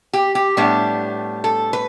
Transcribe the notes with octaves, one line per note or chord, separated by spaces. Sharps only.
G4
G4
A2 G3 B3 D4
A4
B4